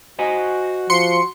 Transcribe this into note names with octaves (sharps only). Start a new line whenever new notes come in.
F#4 C5 D#5 G#5
F3 C6 C#7